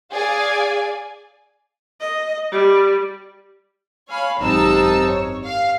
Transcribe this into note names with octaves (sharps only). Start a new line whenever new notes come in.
G#4 D5 F5 G#5
D#5
G3
C#5 F5 G#5 B5
G#1 F#2 C3 D#4 A5 E6
C#5
F5